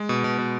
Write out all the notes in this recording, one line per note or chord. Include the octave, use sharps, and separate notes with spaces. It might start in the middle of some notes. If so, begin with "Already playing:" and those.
Already playing: G#3
B2
B2
B2